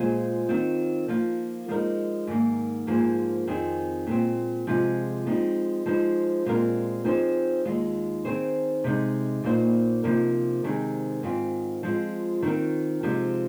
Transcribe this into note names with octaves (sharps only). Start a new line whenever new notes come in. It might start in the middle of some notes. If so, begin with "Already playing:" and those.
Already playing: A#2 G#3 F4 G#4 C5
D#3 C4 F4
F3 A#3 F4
F3 G#3 D#4 A#4
G#2 D#3 A#3
G#2 F3 A#3 G#4 C5
F2 D#3 C4 G#4
A#2 G#3 C4
C3 F3 G#3 F4 G#4
F3 G#3 C4 D#4
F3 G#3 D#4 C5
A#2 G#3 C4 F4 A#4
F3 C4 D#4 G#4 C5
D#2 D#3 G#3 F4
D#3 C4 G#4 C5
C3 G#3 D#4
A#2 A#3 D#4 C5
C3 F3 A#3 D#4 A#4
C3 D#3 G#3 C4 G#4
G#2 D#3 C4 F4
F3 G#3 C4 F4
D#3 C4 F4 A#4
C3 F3 G#3